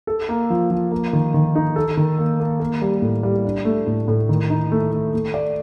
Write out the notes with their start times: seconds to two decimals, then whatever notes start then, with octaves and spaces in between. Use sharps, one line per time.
0.07 A4
0.29 A#3
0.50 F3
0.71 F3
0.91 A#3
1.13 D#3
1.34 D#3
1.55 D#4
1.76 A4
1.97 D#3
2.19 A#3
2.40 A#3
2.60 A#3
2.82 G3
3.02 A2
3.23 G3
3.45 D4
3.65 A3
3.87 A2
4.08 A2
4.29 D#3
4.50 D#4
4.72 A3
4.92 A3
5.14 A3
5.34 D5